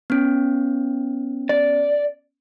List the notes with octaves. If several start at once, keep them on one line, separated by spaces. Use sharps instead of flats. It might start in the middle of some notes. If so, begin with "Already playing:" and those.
B3 C#4
D5